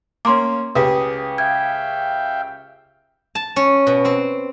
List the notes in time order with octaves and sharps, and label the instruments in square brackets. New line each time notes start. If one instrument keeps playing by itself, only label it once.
[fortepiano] A#3 C#4 [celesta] C6 D6
[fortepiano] C#2 G4 G#4 [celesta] B4
[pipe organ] E5 F5 G5 [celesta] G#6
[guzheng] A5
C#4
B2
C4